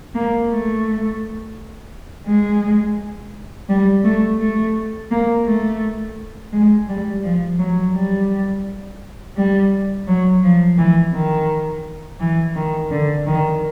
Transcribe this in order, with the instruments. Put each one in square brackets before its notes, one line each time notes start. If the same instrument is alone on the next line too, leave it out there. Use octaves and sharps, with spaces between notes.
[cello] A#3
A3
G#3
G3
A3
A3
A#3
A3
G#3
G3
F3
F#3
G3
G3
F#3
F3
E3
D#3
E3
D#3
D3
D#3